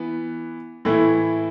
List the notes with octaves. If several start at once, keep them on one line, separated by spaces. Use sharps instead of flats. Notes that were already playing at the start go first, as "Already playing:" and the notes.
Already playing: E3 B3
A2 E3 A3 E4